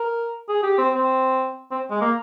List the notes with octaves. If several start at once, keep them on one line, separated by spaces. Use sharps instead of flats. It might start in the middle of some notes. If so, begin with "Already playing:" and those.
Already playing: A#4
G#4
G4
C4
C4
C4
G#3
A#3